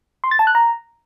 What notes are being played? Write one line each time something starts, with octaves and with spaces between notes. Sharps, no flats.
C6
A6
A5
F#6
A#5